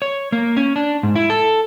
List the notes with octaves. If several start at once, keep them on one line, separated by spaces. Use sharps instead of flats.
C#5
A#3
C#4
D4
G#2
E4
A4